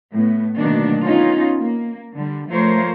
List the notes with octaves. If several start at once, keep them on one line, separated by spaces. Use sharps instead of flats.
A2 B3
D2 B2 D#3 F#3 A#3 D4
B3 C#4 D#4 F4
A#3
D3 G3
F3 A3 F4 A#4 C5 C#5